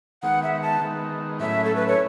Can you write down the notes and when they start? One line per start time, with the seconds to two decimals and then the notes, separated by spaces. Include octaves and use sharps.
0.23 D#3 G#3 B3 F#5
0.43 E5
0.62 A5
0.81 D#3 G#3 B3
1.40 A2 F#3 A3 C#4 E4 E5
1.64 A4
1.76 B4
1.88 C#5